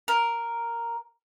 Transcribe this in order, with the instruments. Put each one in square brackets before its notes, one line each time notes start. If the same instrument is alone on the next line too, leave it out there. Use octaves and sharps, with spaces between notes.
[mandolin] A#4